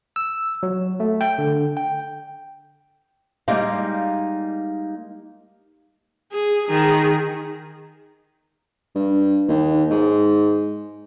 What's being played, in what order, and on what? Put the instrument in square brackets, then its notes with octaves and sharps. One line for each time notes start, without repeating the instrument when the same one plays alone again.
[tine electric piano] E6
F#3
A3
G5
D3
G5
[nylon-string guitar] G3 G#3 A#3 D#4 F5
[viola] G#4
D#3 G#4
[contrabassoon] G2
D#2
G#2